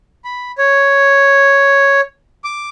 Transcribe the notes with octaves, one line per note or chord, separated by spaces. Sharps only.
B5
C#5
D6